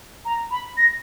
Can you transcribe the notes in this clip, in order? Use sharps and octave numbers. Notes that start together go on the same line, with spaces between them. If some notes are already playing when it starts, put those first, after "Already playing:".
A#5
B5
A#6